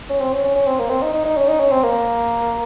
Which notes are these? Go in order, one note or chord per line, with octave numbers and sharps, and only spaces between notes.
C#4
C4
C#4
C#4
C#4
C4
A#3
C4
D#4
D#4
D#4
C#4
D#4
C#4
C4
A#3